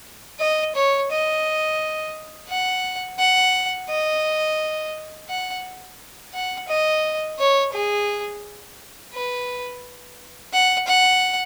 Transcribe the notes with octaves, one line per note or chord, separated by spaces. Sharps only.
D#5
C#5
D#5
F#5
F#5
D#5
F#5
F#5
D#5
C#5
G#4
B4
F#5
F#5